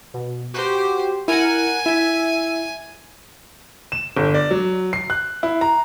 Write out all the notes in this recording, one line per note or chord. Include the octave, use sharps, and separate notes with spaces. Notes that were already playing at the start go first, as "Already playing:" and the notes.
B2
F#4 G4 C5
E4 A#4 F#5 G#5
E4 E5
E7
G1
D5
F#3
C7
F#6
E4
A#5